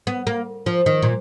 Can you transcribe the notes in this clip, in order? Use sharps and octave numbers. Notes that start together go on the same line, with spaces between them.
B3
A#3
F3
D#3
A#2